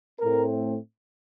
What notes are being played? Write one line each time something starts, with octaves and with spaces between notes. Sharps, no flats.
A2 A3 C4 A#4